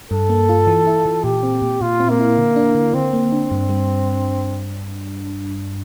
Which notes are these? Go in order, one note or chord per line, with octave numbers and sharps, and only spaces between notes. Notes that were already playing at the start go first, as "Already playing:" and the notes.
G2 A4
A#3
F4
E3
E4
E3
A#2 G4
C4
A#2
A#2 F4
C4
A#3
E4
D3
D4
D3
D3 C4
A#3
D4
G2
G3